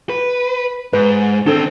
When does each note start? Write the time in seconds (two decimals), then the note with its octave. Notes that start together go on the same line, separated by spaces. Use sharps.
0.10 B4
0.93 G#2 B4
1.47 D#3 C4 D4 A4